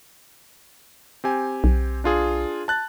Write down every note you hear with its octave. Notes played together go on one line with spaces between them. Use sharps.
C4 G4 G#5
B1
D4 F4 G#4
A5 F#6 A6